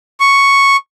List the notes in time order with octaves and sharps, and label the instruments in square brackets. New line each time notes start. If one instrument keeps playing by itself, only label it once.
[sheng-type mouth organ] C#6